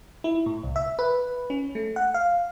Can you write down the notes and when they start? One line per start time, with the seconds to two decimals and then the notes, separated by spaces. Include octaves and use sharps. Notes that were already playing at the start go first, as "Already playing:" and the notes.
0.24 E4
0.46 A2
0.63 C2
0.76 E5
0.99 B4
1.50 C#4
1.75 A3
1.96 F#5
2.14 F5